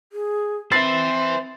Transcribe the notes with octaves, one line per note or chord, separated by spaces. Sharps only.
G#4
C4 B4 C5 E5 A6 C7